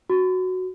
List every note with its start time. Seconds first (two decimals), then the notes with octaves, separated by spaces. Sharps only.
0.10 F#4